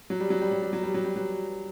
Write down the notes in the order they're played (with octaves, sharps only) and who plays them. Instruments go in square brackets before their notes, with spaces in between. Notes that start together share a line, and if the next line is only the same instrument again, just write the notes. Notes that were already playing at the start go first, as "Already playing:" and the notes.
[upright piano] F#3
G3
F#3
G3
F#3
G3
F#3
G3
F#3
G3
F#3